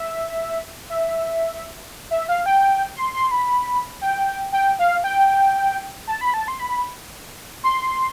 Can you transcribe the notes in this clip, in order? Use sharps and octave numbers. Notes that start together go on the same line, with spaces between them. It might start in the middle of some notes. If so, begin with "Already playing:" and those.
Already playing: E5
E5
E5
F5
G5
C6
C6
B5
G5
G5
F5
G5
A5
B5
A5
C6
B5
C6